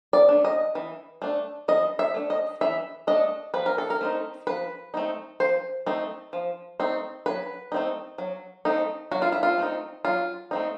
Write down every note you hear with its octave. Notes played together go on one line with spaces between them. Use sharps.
D5
A3 D4
D#5
E3
A3 D4
E3 D#5
E5
A3 D4
D#5
E3 E5
A3 D4 D#5
F3 B4
A#4
A4
A#4
A3 C4 D#4
F3 B4
A3 C4 D#4
F3 C5
A3 C4 D#4
F3
A3 C4 D#4
F#3 B4
A3 C4 D#4
F#3
A3 C4 D#4
F#3 F#4
F4
E4
F4
A3 C4 D#4
F#3 F4
A3 C4 D#4